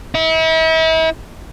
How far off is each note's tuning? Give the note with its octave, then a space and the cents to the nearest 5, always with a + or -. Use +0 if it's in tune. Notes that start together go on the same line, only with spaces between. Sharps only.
E4 -40